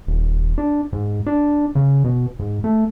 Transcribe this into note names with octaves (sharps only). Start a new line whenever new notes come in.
D#1
D4
G#2
D4
C#3
B2
G#2
A3